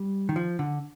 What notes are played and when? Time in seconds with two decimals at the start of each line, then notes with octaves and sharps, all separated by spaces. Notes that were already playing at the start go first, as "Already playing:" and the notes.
Already playing: G3
0.29 D#3
0.36 F3
0.59 D3